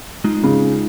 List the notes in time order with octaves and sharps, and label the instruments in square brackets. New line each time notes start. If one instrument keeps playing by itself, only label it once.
[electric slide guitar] G#3 D#4 F4
[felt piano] C#3